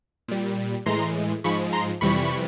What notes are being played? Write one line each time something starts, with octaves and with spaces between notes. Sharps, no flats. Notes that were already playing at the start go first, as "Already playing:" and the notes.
A#2 G3
A2 E3 G#3 A#5 C6
G#2 F3 G#3 B5 C#6
A#5 C6
F2 C3 E3 G3 B5 C#6